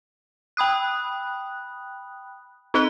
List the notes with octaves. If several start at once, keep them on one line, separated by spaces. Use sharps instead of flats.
G5 B5 D#6 F#6
C4 D#4 D#5 F#6 G7